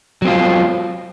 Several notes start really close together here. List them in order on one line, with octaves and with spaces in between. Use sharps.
F#3 C4 F4